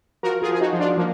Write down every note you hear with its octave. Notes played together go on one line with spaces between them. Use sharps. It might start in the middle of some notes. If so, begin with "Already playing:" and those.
F3 F#4 A#4
F4 G#4
F3
G#4
D#4 F#4
F3
D4 F4
F3 A#3